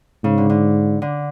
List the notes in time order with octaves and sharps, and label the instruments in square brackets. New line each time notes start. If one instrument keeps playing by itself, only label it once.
[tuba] G#2 [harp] C#3
[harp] D3
D3
D3